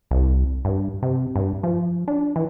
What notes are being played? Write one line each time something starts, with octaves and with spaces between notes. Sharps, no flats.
C2
G2
C3
G2
F3
D4
E3